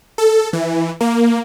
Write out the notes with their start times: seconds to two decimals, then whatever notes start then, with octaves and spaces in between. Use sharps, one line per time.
0.18 A4
0.53 E3
1.01 A#3